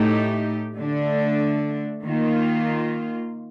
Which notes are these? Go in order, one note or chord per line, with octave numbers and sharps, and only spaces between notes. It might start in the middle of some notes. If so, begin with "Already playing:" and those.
Already playing: A2 A3 D#4 G4
D3 A3 D4
D#3 A#3 F4